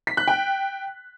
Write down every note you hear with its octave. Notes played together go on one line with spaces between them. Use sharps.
B6
F#6
G5